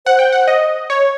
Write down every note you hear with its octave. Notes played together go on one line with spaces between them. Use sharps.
C5 F#5
G5
F#5
D#5
C#5